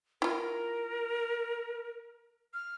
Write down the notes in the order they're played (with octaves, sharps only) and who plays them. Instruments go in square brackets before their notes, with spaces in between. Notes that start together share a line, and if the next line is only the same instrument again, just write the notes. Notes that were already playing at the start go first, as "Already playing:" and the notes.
[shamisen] E4 F4 [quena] A#4
[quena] F6